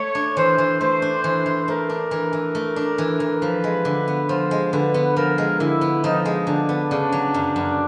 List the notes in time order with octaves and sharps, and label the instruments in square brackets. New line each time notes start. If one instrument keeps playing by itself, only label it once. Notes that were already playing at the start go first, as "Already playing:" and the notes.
Already playing: [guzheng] A3 [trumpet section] C#5
[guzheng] D4
[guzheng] E3 [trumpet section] C5
[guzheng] E3
[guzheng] A3 [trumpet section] C5
[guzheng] D4
E3
E3
[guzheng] A3 [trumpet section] A#4
[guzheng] D4
E3
E3
A3
D4
E3
E3
[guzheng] F3 [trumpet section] B4
[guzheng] G#3
D3
B3
[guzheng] F3 [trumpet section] C5
[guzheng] G#3
[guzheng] D3 [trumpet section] B4
[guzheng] B3
[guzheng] F3 [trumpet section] A#4
[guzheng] G#3
[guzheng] D3 [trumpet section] E4
[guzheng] B3
[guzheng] F3 [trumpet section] D#4
[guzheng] G#3
[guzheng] D3 [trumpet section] D4
[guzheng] B3
[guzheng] C#3 [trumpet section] D4
[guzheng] F#3
F#2
F#2